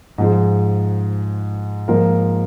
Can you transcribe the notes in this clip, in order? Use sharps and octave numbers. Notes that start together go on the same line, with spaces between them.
G#2 F3 G#3
G#2 F3 A#3 F4 A#4